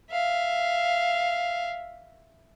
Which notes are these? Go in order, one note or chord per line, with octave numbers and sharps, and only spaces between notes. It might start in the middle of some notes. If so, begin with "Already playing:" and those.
E5 F5